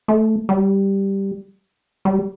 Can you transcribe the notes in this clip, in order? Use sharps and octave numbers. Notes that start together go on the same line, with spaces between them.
A3
G3
G3